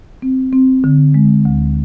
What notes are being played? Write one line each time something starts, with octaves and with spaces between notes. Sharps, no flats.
C4
C4
D3
G#3
D2